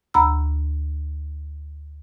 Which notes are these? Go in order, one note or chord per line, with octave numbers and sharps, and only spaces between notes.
D2 A#5 B5 E6